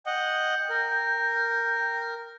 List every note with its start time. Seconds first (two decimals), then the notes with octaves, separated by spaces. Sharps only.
0.06 D#5 F#5 G5
0.70 A#4